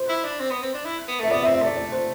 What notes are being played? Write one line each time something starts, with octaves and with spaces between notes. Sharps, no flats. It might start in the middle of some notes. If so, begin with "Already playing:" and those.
Already playing: C5
E4
D4
C4
B3
C4
D4
E4
B3
A3 E5
B3 D5
E5
C4
E5
A3 D5
D5
C5